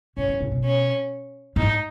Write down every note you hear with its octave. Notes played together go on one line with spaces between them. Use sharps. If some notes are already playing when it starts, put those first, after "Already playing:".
C#3 C#4
D#3
C#3
B2
C#4
G#2 D#4